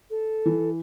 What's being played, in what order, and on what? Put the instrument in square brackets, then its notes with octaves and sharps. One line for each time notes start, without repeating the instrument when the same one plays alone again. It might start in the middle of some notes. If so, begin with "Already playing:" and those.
[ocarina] A4
[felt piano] E3